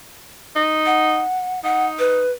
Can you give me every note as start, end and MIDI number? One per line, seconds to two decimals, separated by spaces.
0.56 1.22 63
0.86 1.62 78
1.63 2.23 63
1.63 1.86 78
1.99 2.31 71